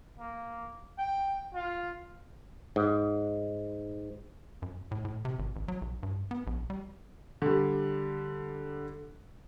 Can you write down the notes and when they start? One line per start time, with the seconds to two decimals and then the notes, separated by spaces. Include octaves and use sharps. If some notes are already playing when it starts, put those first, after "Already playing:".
0.19 A#3
0.98 G5
1.54 F4
2.76 G#2
4.62 F#2
4.91 A2
5.05 A2
5.25 C3
5.39 G#1
5.56 A1
5.68 F#3
5.82 B1
6.03 G2
6.31 B3
6.47 A#1
6.70 G3
7.42 D3 G3